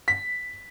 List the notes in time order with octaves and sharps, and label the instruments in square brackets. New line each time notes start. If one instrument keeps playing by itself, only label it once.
[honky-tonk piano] B6